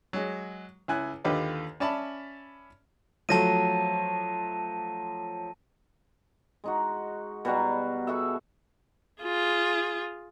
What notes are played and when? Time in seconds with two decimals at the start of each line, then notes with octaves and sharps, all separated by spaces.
0.13 F#3 G#3
0.88 C#2 E4 G#5 F#6
1.24 D#2 D3 F4 G4 B4 D#5
1.80 C#4 D5 E5 A5 B5
3.29 F3 F#3 A3 A5 A#6 D#7
6.64 G#3 D#4 F#4
7.45 B2 G3 F#4 A#5
8.07 F#4 G#4 A4 E5
9.22 F4 G#4